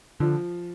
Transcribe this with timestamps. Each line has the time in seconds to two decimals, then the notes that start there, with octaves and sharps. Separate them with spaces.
0.20 D3 F3